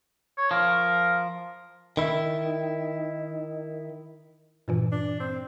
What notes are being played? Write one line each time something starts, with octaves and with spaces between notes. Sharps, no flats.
C#5
F3 A#4
D#3 E4
G2 A#2 E3
D4
C4